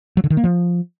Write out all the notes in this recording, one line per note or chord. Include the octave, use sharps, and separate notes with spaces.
F#3
D3
D#3
A#3
F3